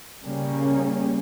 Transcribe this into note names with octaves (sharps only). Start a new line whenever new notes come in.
C#3 G3 A#3 C#4